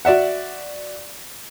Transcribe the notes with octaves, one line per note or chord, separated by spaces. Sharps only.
F#4 D5 E5 F#5